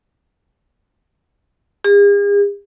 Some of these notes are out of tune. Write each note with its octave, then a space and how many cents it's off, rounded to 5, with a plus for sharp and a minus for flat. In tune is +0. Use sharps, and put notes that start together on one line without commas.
G#4 -45